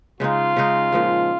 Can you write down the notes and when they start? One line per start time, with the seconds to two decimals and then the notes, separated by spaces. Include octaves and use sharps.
0.20 C#3 G#3 D#4 F4
0.56 C#3 G#3 D#4
0.92 A#2 F3 G#3